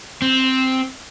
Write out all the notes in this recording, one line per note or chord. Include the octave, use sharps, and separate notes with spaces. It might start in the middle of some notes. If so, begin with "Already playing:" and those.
C4